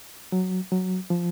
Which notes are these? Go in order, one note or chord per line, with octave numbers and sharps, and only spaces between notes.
F#3
F#3
F3